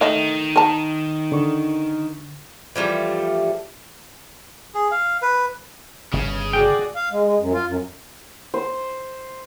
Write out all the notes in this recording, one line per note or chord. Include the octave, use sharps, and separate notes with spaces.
D#3 A3 D#5 F5
A#4 A5
D3 C#6
E3 F3 G3 A3
G#4
F5
B4
G1 C#3
F#4 G#4 D5 G5
F5
G#3
G#3
F#2
F4
F#2
C5